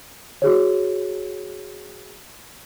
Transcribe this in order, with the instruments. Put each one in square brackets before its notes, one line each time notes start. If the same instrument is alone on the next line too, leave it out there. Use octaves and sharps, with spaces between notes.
[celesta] F#4 G#4 C#5